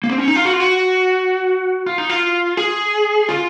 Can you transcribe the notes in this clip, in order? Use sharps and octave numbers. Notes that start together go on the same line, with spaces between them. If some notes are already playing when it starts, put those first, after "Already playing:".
A#3
C4
C#4
D#4
F4
F#4
F4
F#4
F4
D#4
F4
G#4
F4